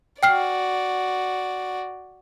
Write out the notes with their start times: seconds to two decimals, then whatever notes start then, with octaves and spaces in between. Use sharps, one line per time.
0.23 F#4 D5 G5 F6 C7